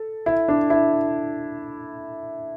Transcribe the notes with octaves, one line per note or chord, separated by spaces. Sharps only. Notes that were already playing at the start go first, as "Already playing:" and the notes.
Already playing: A4
E4
D4
E4